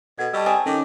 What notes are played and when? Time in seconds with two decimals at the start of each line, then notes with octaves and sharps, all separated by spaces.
0.19 B2 A4 F#5 G#6
0.34 G3 D#5 A5 C#6 E6
0.46 C4 G#4 G#5
0.66 D#3 C#4 A4 D6